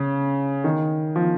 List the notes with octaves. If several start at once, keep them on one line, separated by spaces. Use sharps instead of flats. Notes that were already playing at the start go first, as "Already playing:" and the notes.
Already playing: C#3
D#3
F3